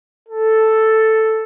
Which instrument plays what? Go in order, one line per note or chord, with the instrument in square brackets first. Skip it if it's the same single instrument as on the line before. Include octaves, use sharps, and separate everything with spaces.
[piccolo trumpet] A4